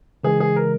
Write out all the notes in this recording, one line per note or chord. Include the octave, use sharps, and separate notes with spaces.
C#3 E3 G#3 G#4
G#4
A#4